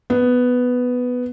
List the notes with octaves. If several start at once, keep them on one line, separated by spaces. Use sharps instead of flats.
B3